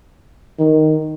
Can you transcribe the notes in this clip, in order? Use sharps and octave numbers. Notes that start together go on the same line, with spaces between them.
D#3